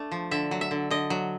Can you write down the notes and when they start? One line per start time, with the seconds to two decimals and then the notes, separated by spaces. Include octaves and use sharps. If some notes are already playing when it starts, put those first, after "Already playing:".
Already playing: A3 D4
0.11 F3
0.31 D3 E5
0.51 F#3
0.61 E5
0.71 D3
0.90 D3 D#5
1.10 F#3